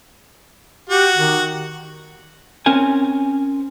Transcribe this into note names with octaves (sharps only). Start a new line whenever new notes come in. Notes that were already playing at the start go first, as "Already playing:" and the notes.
F#4 G4
D#3
C4 C#4 A#4 G#5